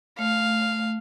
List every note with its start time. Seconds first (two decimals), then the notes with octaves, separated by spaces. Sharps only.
0.19 A3 F5